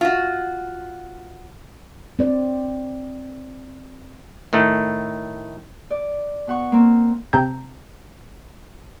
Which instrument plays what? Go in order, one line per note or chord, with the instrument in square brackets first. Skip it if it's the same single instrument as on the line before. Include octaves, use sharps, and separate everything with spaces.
[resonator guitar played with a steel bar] F4 F#4
[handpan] C4 D5
[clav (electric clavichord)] A2 D#3 A3
[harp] D5
B2 F#5 C#6
A#3 C4
[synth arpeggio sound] C3 C4 A5 A#5 G6